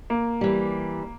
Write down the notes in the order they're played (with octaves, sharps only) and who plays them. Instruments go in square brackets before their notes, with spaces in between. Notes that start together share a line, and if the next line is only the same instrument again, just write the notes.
[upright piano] A#3
[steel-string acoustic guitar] E3 G3